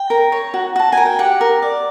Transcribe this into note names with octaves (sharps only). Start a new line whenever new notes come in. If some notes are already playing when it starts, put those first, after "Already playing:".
Already playing: G5
A#4
C#5
F#4
F#4 A5
A#4 G#5
G5
G4 F#5
A#4
D5